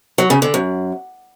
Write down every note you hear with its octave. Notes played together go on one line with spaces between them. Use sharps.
F#3
C#3
D3
F#2